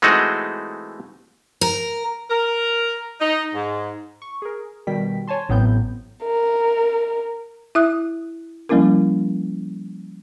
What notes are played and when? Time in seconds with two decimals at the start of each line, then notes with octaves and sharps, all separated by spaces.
0.02 E3 G#3 A3 C4 D#4 F#4
1.61 A#4
2.30 A#4
3.20 D#4
3.54 G#2
4.22 C#6
4.42 G#4 A#4
4.87 B2 D#3 G3 G5 B6
5.28 C#5 G#5 A5 C6
5.49 A1 A2 F#3 B3 C4 G6
6.24 A#4
7.75 E4 E5 D#6 F#6
8.69 F3 G3 A#3 C#4 E4 A#4